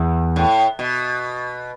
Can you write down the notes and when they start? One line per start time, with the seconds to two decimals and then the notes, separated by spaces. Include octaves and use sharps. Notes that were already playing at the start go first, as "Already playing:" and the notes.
Already playing: E2
0.36 A2
0.79 B2